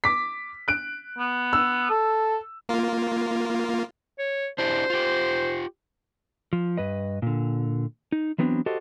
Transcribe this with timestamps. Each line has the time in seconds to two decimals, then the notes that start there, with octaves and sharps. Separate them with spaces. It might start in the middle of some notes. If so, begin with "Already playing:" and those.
0.04 D6 B6
0.68 F#6 D7
1.18 B3
1.53 E6
1.90 A4
2.69 A#3 F4
4.19 C#5
4.58 D4 E4 G4 C5
4.90 F4 G4
6.53 F3
6.78 G2 B4 D#5
7.22 A#2 D3
8.12 D#4
8.38 E3 F#3 B3 C4 D4
8.66 F#4 G4 A4 C5 D#5